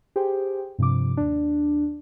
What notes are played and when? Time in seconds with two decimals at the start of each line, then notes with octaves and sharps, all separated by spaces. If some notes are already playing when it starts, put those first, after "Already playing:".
0.16 G4 G#4 C5 G5
0.78 G2 C3 F3 D6
1.17 D#2 D4